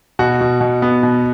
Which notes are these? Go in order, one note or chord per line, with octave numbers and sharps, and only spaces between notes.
B2 F#4
B2
B2
B3
B2